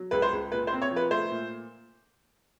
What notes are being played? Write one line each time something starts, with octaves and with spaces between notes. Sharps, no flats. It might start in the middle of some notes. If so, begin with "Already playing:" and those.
Already playing: F#3
C#2 B4
C5
C#2
A#2 B4
C5
C4
C#5
F3
B4
A3 C5
A#2